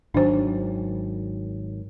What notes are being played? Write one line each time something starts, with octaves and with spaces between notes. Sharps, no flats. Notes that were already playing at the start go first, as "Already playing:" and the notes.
G#1 D#3 F#3 D4 C5